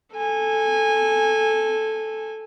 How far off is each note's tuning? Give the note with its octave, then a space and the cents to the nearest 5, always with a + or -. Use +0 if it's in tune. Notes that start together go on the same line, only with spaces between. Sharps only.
A4 -5 G#5 -20